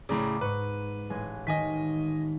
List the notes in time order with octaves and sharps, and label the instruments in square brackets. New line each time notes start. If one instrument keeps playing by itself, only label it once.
[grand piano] A2 C#3 [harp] D5 A#5
[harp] G#2 C#6 [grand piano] B4
[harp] A1 G#3 G#5
[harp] D#3 [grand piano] D#5 G#5 B6